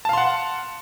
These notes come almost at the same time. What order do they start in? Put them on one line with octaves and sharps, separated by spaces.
A5 F5 C6 F#5